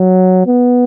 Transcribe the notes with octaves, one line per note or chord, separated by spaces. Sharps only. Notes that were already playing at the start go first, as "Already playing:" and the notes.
Already playing: F#3
B3